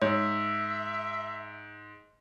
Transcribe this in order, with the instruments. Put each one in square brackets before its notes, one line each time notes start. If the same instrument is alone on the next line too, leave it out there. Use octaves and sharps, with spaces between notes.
[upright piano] G#2 [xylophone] C#5 [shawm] E5